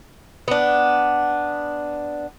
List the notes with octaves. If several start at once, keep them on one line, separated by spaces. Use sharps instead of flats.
B3 D4